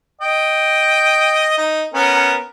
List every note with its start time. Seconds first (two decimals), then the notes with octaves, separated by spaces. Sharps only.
0.21 D#5 G5
1.58 D#4
1.94 B3 C#4 A#4